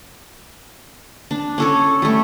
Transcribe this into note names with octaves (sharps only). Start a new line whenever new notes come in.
D4
C#4 A4 C#5
G3 A3